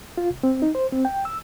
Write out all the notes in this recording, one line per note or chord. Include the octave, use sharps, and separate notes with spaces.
F4
C2
C4
D#4
C5
C4
G5
E6